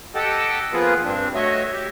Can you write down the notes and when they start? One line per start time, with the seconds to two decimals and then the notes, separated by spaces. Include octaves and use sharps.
0.15 G4 A4 D#5 F#5 G5 A5
0.73 F3 A#3 B3 F4 G#4 B4
1.04 G2 C4 D4
1.35 A3 F#4 C#5 D#5 E5
1.73 G4 E5